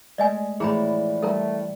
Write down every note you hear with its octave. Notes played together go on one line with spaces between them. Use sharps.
G#3 A3 D5 D#5 G#5
A2 E3 F3 E4 G#4 D5 A#5 B5
G3 A3 A4 A#4 A#5